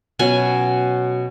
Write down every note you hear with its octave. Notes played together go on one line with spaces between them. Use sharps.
B2 F#3 C#4 G#5